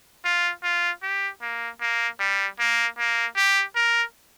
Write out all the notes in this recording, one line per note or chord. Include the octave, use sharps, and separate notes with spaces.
F4
F4
G4
A#3
A#3
G3
A#3
A#3
G4
A#4